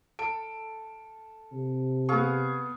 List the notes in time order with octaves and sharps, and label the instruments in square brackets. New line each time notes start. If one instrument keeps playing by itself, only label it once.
[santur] A4 [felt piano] D7
[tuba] C3
[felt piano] B3 C#6 [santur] G#4 F5